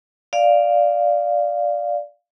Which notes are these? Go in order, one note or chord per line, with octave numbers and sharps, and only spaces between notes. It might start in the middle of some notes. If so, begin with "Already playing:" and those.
D5 F5